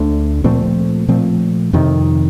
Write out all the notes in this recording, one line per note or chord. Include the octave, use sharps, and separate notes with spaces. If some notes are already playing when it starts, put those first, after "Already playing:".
Already playing: D2 D3 A3
A#2 F3 A3 C4
A#2 F3 A3 C4
F2 C3 D#3